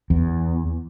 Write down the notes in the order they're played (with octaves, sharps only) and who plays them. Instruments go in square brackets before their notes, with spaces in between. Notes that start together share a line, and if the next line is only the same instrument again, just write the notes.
[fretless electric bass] E2